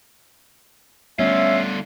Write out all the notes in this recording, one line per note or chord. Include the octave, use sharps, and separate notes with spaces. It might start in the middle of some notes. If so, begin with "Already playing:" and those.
D3 G3 A3 B3 C#4 F4 E5